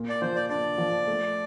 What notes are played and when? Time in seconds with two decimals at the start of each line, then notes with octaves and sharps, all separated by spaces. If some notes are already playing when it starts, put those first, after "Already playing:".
Already playing: A#2
0.09 D5
0.21 F3 C5
0.35 D5
0.49 D4 D5
0.78 F3
1.07 A3